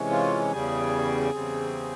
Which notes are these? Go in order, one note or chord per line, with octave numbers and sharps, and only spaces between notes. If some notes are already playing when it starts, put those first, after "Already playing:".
Already playing: C3 E3 G#3 C#4
F4
E2 C#3 G3 G#4
E2 C#3 G3 C4